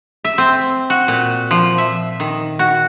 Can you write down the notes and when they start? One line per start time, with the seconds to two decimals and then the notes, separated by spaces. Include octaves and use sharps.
0.24 E5
0.38 C4
0.90 F#4
1.08 A#2
1.51 F3
1.78 E5
2.20 D#3
2.59 F#4